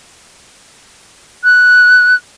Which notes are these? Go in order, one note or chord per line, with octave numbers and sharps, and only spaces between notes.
F#6